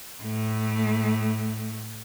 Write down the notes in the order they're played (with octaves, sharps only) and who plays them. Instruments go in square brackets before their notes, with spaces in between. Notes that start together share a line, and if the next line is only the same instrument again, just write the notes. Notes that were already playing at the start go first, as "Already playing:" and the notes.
[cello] A2 A3